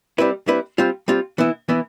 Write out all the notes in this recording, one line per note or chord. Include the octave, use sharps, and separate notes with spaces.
G3 C4 E4 B4
G3 C4 E4 B4
G3 C4 F4
G3 C4 F4
E3 B3 E4
E3 B3 E4